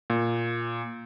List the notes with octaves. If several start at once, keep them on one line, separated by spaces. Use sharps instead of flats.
A#2